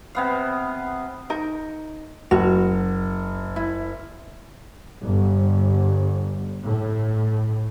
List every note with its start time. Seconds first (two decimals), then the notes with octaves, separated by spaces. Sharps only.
0.15 C3 B3 F5
1.30 D#4 A#4
2.31 F#1 F#4
3.56 E4
5.04 G1
6.63 A2